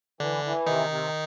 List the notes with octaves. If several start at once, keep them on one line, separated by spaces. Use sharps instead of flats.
D3 E3 D4
E3
C3 D#3 D#4
C3